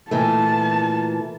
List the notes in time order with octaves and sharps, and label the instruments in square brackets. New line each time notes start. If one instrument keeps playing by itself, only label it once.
[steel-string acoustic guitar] A#2 E3 A3 [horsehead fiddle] A5